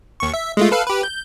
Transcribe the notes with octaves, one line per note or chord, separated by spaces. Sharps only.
D#2 C#6
E5
G#3 A3 F4
A4 B4 F5
G4 B4
G6